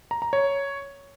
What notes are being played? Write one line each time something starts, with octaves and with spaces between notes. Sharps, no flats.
A#5
A#5
C#5